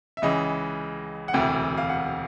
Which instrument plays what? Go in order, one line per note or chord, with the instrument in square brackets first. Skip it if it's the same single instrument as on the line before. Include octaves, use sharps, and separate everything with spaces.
[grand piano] E5
C#2 C#3 E3 D#5
F#5
E1 D2 C3 E3 G5
F5
F#5